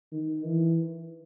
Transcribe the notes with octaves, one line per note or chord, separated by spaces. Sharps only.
D#3
E3